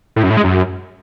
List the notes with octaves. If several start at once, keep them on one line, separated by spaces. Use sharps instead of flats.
A2
F#2
A2
G#3
F#2